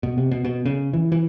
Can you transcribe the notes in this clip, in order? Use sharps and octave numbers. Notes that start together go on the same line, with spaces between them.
B2
C3
B2
B2
C#3
E3
E3